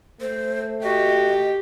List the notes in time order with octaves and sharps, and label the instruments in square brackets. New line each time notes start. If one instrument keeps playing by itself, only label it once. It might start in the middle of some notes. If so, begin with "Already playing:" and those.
[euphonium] A3 [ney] C5
[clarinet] F#4 [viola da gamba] G4 [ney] D#5